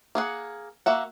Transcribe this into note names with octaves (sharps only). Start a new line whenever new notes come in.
A#3 G#4 F#5
A#3 F#4 E5 F#5